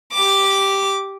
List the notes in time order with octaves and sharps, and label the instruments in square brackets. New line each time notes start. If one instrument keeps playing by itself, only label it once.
[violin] G4 D6